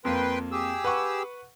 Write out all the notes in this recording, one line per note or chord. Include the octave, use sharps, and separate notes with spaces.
F2 A#3 B4 G5 C6
G4 G#4 E6
B4 F#5 C#6